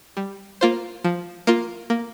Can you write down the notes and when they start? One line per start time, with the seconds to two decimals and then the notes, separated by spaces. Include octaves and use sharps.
0.17 G3
0.61 A#3 F4 C5
1.04 F3
1.47 A#3 F4
1.90 A#3